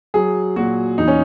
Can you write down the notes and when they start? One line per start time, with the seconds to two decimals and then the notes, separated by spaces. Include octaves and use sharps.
0.14 F#3 G#4
0.56 A#2 F#4
0.98 E2 D#4
1.08 C#4